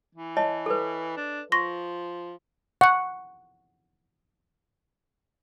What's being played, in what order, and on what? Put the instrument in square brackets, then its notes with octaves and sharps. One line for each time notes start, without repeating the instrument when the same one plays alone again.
[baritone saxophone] E3
[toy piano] C#5 D#5 A5
A4 B4
[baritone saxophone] D4
[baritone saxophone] F3 [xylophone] C6 C#6 A#6
[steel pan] F#5 [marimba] C#6 F#6